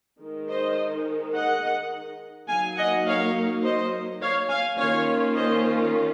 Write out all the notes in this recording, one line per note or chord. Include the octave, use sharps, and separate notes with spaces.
D#3 G#3 D#4
C5 D#5
D#5 F#5
F#3 A#3 D#4 F5 G#5
D#5 F#5
C#5 F5
C5 D#5
C#5 F5
F5 G#5
D#3 A#3 C#4 F4 C#5 F5
C5 D#5